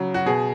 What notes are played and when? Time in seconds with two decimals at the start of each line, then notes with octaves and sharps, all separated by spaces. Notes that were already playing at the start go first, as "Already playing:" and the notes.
Already playing: C#3 F#3
0.14 F#4
0.26 B2 G#4